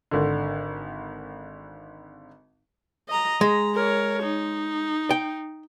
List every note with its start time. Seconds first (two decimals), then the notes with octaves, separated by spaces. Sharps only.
0.11 G#1 D3
3.08 D#5 A#5
3.41 G#3 A#5
3.75 A#4 C#5
4.23 D#4
5.10 G5